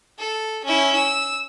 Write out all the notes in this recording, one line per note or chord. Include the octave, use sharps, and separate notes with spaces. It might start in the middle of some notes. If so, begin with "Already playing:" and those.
A4
C#4 E4
E6